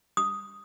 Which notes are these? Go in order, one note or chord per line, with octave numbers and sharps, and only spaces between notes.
D#6